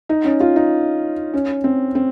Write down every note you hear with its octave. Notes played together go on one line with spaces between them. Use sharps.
D#4
C#4
F4
D#4
C#4
C4
C4